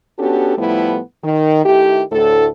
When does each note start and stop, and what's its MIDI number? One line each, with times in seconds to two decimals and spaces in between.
0.19 0.56 59
0.19 0.56 61
0.19 0.56 62
0.19 0.56 66
0.19 0.56 67
0.19 0.56 69
0.58 0.99 45
0.58 0.99 53
0.58 0.99 55
0.58 0.99 57
0.58 0.99 59
0.58 0.99 64
1.24 1.63 51
1.65 2.03 51
1.65 2.03 57
1.65 2.03 64
1.65 2.03 67
2.12 2.48 38
2.12 2.48 45
2.12 2.48 69